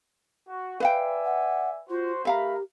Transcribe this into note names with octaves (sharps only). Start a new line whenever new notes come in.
F#4
B4 D5 E5 F5 G5 G#5
F#5
F4 F#4 C5
A3 G4 A#4 E5 F5 A#5 B5